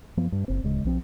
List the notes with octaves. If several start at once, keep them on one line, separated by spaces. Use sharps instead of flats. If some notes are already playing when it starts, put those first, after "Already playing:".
F#2 F3 B3
G2
F#1 C4
D1 C#3 G#3
B1 F3 C4